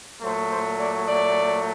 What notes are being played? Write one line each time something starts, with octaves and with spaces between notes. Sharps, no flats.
A#2 F#3 A3 C5
C5
D5
D5